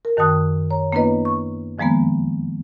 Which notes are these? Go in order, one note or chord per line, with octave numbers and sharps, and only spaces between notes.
A#4
F#2 D#3 G5 A5 D#6 F#6
C#5 A#5
A#3 B3 D4 E4 B4 D#5
C#6
F2 D#3 F3 G#3 A#3 B3